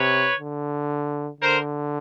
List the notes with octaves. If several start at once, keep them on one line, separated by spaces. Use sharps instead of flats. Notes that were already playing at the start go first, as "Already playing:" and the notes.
Already playing: C3 B4 C#5
D3
D3 A#4 C5